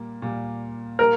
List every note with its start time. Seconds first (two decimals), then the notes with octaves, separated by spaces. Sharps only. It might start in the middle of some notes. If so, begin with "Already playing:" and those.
Already playing: A#2 G3 A#3
0.22 A#2 G3 A#3
0.99 G3 A#3 A#4